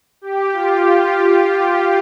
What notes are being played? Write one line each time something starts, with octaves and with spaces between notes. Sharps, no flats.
G4
F4